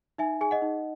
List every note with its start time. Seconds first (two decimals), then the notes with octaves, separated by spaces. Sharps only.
0.18 D#4 E5 G#5
0.41 G#4 G#5
0.51 D#5 F#5
0.62 D#4